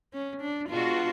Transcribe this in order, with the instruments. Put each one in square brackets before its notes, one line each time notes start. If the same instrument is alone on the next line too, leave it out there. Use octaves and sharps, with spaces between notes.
[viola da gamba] C#4
D4
[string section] B2 G#3 B3 D4 F#4 [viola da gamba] F4